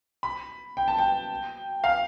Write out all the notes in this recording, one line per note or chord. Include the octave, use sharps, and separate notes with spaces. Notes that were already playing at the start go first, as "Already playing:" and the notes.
B5
G5
A5
G5
F5